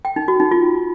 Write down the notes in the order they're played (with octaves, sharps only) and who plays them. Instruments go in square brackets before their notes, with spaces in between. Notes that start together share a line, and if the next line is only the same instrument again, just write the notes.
[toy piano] G5
D#4
F#4
D#4
F4